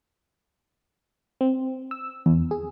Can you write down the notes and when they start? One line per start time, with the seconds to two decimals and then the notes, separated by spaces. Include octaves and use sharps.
1.41 C4
1.91 E6
2.26 E2
2.51 G#4